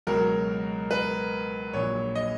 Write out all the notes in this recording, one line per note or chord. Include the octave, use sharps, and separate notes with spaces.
C#2 B2 F#3 A#4
B4
A#1 A#2 F#3 C#5
D#5